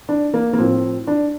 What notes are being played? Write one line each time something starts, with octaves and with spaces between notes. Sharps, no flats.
D4
A#3
A#3
A2 F3 C4
D4